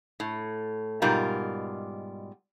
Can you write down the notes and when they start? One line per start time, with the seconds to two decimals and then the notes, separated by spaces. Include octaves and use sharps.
0.20 A2
1.02 G#2 B2 G3 F4 A#4